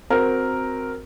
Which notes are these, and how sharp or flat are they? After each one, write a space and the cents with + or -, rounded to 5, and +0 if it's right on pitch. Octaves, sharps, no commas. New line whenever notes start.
C4 +0 F#4 +0 A#4 +0